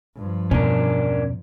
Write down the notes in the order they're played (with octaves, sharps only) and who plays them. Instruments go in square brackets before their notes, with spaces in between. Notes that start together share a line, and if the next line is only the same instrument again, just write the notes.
[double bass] G2 F3
[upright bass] E2 B2 [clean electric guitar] C#4 D4 A#4